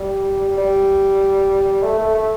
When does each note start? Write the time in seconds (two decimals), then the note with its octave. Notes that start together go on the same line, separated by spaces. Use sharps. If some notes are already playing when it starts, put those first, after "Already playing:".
Already playing: G3
0.58 G3
1.83 A3
1.98 A3
2.14 A3